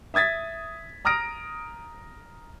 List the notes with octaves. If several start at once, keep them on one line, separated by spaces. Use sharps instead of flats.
E5 D#6 G#6 A6 B6
A#5 D#6 F6 A#6 D7